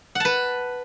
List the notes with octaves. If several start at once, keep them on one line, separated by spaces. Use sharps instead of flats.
B4 F#5 A5